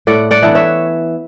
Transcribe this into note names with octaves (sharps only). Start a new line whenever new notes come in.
A2 D5 F#5
D5 F#5
E3 B3 D4
C#5 E5